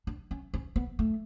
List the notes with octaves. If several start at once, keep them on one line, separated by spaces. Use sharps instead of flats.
D4
C#4
C#4
B3
A3